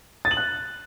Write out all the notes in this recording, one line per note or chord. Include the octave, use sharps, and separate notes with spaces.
A6
F#7
F#6